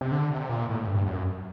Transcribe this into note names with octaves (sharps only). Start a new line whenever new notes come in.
C3
D3
C3
A#2
A2
G2
F#2